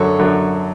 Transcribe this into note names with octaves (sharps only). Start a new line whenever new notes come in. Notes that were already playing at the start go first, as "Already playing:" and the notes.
Already playing: F#2 D3 F#3 A4 C#5
F#2 D3 F#3